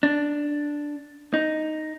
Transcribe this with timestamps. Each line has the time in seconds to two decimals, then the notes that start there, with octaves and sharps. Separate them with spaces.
0.03 D4
1.34 D#4